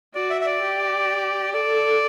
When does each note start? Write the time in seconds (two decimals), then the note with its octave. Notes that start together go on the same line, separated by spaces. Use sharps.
0.14 F#4 D5
0.30 E5
0.41 E5
0.46 D5
0.61 G4
1.53 A4 D5